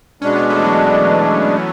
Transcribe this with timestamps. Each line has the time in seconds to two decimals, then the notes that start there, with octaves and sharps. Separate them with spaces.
0.22 B2 G#3 C#4 D4
0.36 B3
0.50 A3
0.58 E3
0.64 F#3